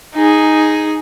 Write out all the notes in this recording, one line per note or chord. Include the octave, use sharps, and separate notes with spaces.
D#4 G#4